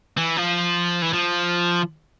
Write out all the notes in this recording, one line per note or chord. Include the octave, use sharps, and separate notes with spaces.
E3
F3
E3
F3